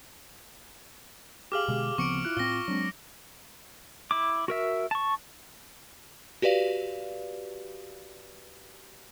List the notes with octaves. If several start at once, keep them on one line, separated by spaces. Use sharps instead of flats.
G4 G#4 F5 D6 F6 F#7
B2 D3 G#3
D2 C#3 F3 B3 C4 C#6 C#7 D7
E4 F4 F#6
A2 C4 F4 A#6 G7
F#3 G#3 C4 D4
E4 D6
F#4 A#4 E5
A5 C#6
F#4 G4 B4 D5 F5